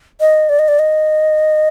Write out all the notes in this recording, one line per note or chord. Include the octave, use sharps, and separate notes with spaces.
D#5
D5
D#5
D5
D#5